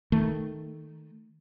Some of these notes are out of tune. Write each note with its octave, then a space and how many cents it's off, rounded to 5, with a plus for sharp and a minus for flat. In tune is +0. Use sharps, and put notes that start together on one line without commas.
D#3 +0 A3 +0